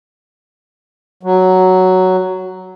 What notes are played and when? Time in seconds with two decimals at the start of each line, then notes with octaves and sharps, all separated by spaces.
1.23 F#3